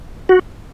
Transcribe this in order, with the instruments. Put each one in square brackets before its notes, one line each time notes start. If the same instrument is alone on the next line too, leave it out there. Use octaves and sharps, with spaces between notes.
[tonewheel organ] F#4